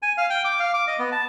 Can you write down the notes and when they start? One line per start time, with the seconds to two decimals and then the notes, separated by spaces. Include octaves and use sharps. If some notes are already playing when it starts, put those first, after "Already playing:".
0.02 G#5
0.17 F5
0.30 G5
0.45 D6
0.60 F5
0.74 D6
0.87 D#5
0.99 B3
1.12 A5